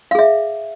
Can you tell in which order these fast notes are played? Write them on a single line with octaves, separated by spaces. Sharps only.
F5 G#4 E5